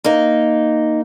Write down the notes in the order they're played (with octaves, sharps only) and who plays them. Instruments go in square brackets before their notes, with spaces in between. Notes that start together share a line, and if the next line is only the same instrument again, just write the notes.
[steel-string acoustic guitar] A#3 D#4